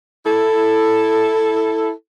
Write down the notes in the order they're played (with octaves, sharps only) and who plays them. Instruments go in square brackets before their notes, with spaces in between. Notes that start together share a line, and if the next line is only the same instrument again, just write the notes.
[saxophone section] E4 A4